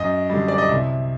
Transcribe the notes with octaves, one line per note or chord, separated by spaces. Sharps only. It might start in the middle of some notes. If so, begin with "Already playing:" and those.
Already playing: F#2 D#5
D3 G3
D5
D#5
C2 E5